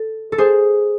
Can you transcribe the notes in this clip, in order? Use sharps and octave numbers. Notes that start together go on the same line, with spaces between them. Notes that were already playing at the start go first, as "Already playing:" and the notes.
Already playing: A4
A4
G#4 C5